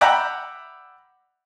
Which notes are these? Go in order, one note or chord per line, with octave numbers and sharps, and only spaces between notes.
D5 E5 F#5 G5 A#5 B5